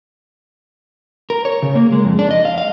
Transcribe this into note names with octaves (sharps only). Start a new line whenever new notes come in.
A#4
C#5
C#3
A#3
G#3
F2
D4
D#5
F5
F5